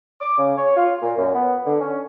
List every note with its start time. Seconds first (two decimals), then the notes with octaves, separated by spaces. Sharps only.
0.20 D6
0.38 C#3
0.57 C#5
0.76 F4
1.01 A#2
1.17 F#2
1.34 B3
1.66 D3
1.81 C#4